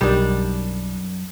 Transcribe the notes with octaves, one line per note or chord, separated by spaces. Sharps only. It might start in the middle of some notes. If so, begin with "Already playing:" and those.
B1 F#2 D#3 G3 D4